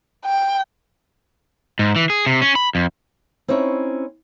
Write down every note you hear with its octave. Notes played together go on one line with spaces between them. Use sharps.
G5
G#2
E3
G#4
C3
C#4
B5
F2
C4 C#4 D#4 E4 C#5